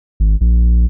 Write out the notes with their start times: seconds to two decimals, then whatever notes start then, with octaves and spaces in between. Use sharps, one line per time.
0.20 G#1
0.41 A#1